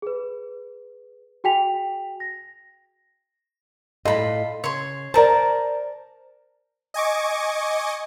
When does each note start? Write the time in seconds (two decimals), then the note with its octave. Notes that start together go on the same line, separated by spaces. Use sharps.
0.02 G#4 B4
1.44 F#4 G#4 G5 G#5 B6 F7
2.20 A#6
4.05 A2 F4 A4 D#5 B5
4.64 C#3 C#5 C6
5.14 A#4 C5 D5 A5
6.94 D#5 G#5 C#6 D6